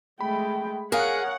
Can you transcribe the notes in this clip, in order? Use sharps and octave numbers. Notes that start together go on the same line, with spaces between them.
G#3 A3 G5 B5
G#4 A#4 C#5 F5 F#5